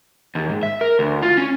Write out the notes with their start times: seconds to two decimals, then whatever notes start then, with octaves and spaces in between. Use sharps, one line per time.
0.35 D#2
0.50 G#2
0.63 E5
0.81 A#4
0.99 D2
1.22 F4
1.37 C#4